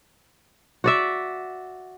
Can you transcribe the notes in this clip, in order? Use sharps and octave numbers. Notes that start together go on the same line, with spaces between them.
F#4 D5 E5